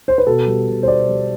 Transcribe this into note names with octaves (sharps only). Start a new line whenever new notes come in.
C5
B4
B2 A4
G3
B2
C5
B2 D5
G3